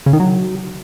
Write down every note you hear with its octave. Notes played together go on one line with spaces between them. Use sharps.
C#3
D#3
F#3